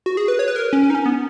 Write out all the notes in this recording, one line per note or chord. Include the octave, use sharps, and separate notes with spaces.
F#4
G#4
B4
C#5
B4
A#4
C#4
C#4
D#4
C#4
B3